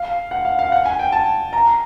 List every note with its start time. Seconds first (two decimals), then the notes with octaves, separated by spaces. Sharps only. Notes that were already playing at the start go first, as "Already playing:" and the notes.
Already playing: F5
0.31 F#5
0.45 F5
0.59 F5
0.72 F#5
0.86 G#5
0.99 G5
1.12 A5
1.53 A#5